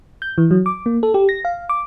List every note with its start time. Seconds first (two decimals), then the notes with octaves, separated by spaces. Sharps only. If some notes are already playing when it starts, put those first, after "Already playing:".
0.22 G6
0.38 E3
0.51 F#3
0.66 D6
0.86 A#3
1.03 A4
1.14 G4
1.29 A#6
1.45 F5
1.69 D6